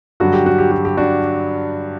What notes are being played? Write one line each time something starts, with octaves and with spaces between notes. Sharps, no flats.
G2 D3 F#3 F#4
G4
F#4
G4
F#4
G4
D4 F#4